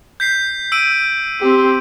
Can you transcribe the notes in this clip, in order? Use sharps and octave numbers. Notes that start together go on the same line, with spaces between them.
G6 B6 C7
E6 D7 D#7
C4 G4